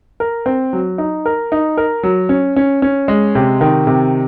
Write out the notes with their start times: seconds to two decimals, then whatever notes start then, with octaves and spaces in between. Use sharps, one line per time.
0.20 A#4
0.46 C4
0.73 F#3
0.98 D#4
1.26 A#4
1.52 D#4
1.77 A#4
2.03 F#3
2.29 C#4
2.56 C#4
2.82 C#4
3.08 G#3
3.35 C3
3.61 D#3
3.87 C3